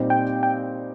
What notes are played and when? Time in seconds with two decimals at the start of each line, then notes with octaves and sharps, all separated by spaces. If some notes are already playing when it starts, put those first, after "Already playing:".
Already playing: A#2 G3 C4 D#4 G4
0.10 G5
0.43 G5